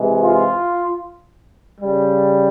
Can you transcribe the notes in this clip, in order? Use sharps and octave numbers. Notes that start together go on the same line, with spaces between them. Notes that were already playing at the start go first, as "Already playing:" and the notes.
Already playing: C3 E3 G#3
F4
C#3 G3